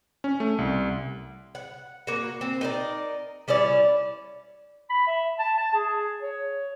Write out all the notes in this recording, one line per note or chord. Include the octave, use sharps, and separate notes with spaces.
C#4
A3
C2
F#5
A#3 F#4
C4
D#4 A#4 D5
G3 C#4 E4 D5
B5
E5
A5
A5
G#4
C#5